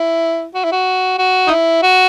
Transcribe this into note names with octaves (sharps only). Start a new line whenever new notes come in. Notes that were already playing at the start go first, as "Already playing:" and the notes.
Already playing: E4
F#4
E4
F#4
F#4
D#4
E4
F#4